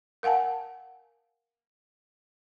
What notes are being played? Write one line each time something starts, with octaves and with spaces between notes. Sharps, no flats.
A#4 F5 F#5 G#5 A5